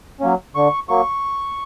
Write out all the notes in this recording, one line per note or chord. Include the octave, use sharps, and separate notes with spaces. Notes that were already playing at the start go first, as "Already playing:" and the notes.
F#3 A#3 C#4
D3 C#6
F#3 A#3 C#6